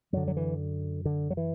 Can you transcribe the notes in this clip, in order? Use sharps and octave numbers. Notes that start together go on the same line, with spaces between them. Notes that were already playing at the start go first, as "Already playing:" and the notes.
F#2 D3 F#3
F#3
E3
D3
F#3
E3